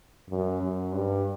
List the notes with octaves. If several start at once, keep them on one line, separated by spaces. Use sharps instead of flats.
F#2
F#2
G2